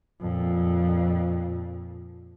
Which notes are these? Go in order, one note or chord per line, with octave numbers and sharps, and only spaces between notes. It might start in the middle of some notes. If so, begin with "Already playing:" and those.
F2 A#2